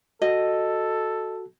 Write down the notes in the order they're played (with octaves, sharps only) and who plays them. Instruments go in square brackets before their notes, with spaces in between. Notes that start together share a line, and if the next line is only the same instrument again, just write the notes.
[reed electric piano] F#4 [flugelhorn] A4 [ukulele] D#5